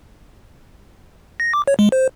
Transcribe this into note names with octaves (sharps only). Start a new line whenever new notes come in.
A#6
D6
C#5
G#3
C5